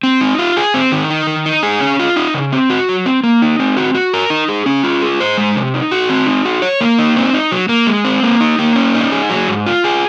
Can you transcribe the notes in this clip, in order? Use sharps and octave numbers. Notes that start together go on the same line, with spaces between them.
C4
D#4
F4
G#4
C4
D#3
D#4
D#3
D#4
G#4
C#4
F4
D#4
C#3
C4
F#4
F#3
C4
A#3
D#4
C4
F#4
F#4
A#4
D#4
G#4
C#4
F4
G#4
C5
G#3
C3
D#4
F#4
C4
D#4
F#4
C#5
A#3
D#4
C4
D#4
F#3
A#3
G#3
C4
A#3
D#4
A#3
C#4
D#4
G#4
F#3
G#2
F4
G#4